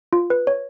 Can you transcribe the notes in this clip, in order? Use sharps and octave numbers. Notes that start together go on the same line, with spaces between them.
F4
B4
C#5